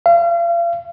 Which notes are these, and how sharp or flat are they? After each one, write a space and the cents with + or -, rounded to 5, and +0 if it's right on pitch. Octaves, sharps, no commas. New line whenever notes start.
F5 -40